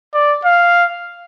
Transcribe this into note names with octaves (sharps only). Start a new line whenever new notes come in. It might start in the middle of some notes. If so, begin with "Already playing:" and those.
D5
F5